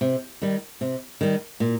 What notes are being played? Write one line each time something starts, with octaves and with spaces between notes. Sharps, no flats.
C3
D#3 G3
C3
D#3 G3
A#2